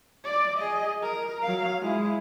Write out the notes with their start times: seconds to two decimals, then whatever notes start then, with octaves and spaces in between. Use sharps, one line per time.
0.24 D5
0.58 G#4 D#5
1.03 A#4
1.43 F#3 F5
1.81 G#3 E4